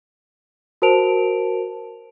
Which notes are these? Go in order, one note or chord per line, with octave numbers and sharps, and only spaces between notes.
F#4 A#4 C5 A5 D7 F7